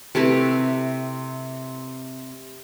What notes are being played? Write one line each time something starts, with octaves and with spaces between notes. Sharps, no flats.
C3 A3 E4 B4